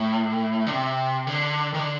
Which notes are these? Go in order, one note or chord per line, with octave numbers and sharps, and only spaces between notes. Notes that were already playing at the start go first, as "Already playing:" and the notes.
Already playing: A2
D3
C3
D3
D#3
D3